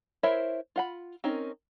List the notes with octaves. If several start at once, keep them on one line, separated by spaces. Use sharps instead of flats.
E4 A#4 C5 C#5 E5
F4 F#5 B5
C4 C#4 D#4 A#4